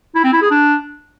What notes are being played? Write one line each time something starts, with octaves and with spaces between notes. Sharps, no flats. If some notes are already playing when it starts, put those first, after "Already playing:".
E4
C4
E4
G#4
D4